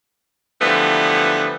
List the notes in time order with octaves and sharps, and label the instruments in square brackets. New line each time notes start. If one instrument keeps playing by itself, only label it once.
[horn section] D3 E3 F3 G3 A3 B3